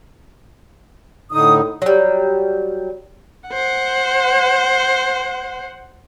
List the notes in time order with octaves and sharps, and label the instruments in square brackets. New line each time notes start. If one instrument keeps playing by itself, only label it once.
[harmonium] A2 D3 D#4 [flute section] D#6
[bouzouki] F#3 G3
[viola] C5 F#5